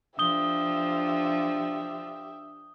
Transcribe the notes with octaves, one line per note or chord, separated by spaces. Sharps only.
F3 D4 G4 E5 D#6 G6 G7